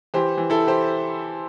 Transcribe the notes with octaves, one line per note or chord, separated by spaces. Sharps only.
E3 G4 C5
E3
E4 A4
G4 C5